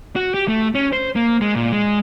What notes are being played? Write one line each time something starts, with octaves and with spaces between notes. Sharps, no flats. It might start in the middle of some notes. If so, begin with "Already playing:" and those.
F#4
G4
A3
C#4
C5
A#3
G#3
A#2
G#3